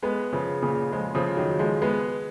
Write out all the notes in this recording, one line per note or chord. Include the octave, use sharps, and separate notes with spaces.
G#3 B3
C#3 F3
A#2 C#3
F3 G#3
C#3 F3
D#3 F#3
F3 G#3
G#3 B3